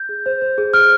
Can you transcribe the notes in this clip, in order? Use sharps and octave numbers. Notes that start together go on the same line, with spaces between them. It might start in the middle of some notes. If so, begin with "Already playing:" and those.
Already playing: G6
G#4
C5
C5
G#4
G#4 F6